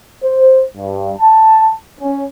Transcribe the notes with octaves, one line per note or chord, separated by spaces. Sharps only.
C5
G2
A5
C#4